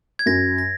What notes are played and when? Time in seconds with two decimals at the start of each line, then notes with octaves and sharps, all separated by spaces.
0.19 G#6
0.26 F#2 A#6
0.58 A#6